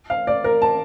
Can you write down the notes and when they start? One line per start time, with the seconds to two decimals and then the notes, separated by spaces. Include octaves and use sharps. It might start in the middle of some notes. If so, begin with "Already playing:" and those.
0.10 F5
0.27 D5
0.44 A#4
0.62 A5